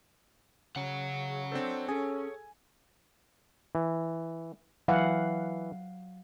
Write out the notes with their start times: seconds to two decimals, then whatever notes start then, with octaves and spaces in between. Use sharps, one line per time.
0.76 C#3 C#5 F#5
1.52 C4 D4 A4 C5
1.88 C#4 G#4 A4 G#5
3.75 E3
4.88 E3 F#3 F5 F#5